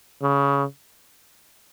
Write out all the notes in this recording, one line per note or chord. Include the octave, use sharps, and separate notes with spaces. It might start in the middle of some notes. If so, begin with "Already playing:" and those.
C#3